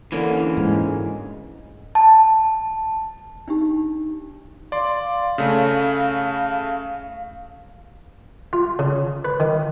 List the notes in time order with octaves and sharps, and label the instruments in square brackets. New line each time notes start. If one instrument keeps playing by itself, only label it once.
[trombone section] D3 [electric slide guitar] E3 A#3 C#4
[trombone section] D2 C#3 G#3 [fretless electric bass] G#2
[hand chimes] A5
[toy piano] D4 D#4 G4
[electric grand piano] D5 C6 [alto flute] F5
[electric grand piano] C#3 A3 C#4
[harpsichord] F4
C#3
B4
D#3